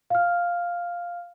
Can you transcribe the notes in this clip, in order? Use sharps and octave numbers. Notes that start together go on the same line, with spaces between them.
F5 F6